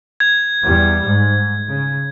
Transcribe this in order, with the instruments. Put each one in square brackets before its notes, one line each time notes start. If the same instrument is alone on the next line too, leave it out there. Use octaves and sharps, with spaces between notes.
[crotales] G#6
[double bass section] E2 G3
G#2
C#3